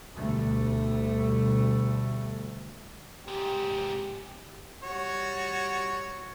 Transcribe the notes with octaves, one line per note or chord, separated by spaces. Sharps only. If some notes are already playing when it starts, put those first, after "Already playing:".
D2 B2 G3 A3
G#2 C3 G4
G3 F#4 C#5